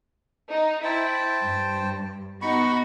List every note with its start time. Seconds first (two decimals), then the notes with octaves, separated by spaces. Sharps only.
0.52 D#4
0.84 E4 C5 G5 A5
1.43 G2
2.42 B3 D#4 F#4 B5 C#6